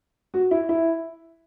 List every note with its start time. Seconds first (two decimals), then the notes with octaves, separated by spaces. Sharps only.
0.34 F#4
0.51 E4
0.69 E4